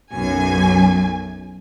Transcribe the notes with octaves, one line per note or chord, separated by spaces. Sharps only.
B1 F#2 G#5